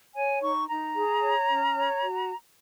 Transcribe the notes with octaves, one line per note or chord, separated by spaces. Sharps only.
C#5 G#5
D#4 C#6
D#4 A#5
G#4
C#5
C#4
C#5
F#4